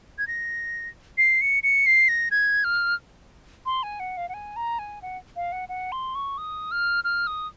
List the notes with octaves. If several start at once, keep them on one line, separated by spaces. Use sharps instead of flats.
G#6
A#6
C7
C#7
C#7
C7
A#6
G#6
F6
C6
G#5
F#5
F5
F#5
G#5
A#5
G#5
F#5
F5
F#5
F#5
C6
C#6
D#6
F6
F6
D#6